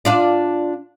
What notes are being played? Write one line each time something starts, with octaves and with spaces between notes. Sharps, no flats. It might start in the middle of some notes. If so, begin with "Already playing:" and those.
D4 F4 D5